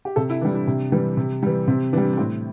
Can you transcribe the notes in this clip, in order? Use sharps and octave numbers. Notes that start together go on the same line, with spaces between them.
G4
C3 A4
E4
E3 G3 D4
D4
C3
E3 G3
C3
E3 G3
C3 C4
E3 G3 D4
D4
A2 C4